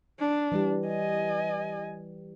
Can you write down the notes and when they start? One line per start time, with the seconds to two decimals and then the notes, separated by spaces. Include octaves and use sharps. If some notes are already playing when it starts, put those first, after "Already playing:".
0.19 D4
0.52 E3 G3 G4
0.87 D#5 G#5